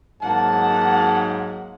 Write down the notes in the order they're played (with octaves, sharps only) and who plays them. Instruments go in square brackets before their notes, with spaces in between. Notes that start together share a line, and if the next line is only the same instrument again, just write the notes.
[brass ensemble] G#2 F#3 [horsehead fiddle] A#3 F#5 [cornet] A5